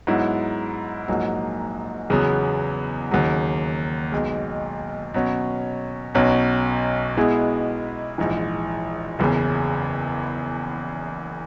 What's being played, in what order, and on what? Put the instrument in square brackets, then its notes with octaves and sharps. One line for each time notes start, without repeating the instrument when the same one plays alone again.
[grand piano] G#2 F#3 B3 E4
A#1 G#2 F#3 A#3
E2 C#3 F#3 B3
D#2 C#3 F#3
B1 B2 G#3
B2 F#3 C#4
B1 B2 F#3 C#4
B2 G#3 B3 E4 G#4
A#1 G#2 E3
F#1 E2 C#3